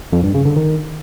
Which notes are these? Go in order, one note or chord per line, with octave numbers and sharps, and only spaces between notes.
F2
G2
C#3
D3
D#3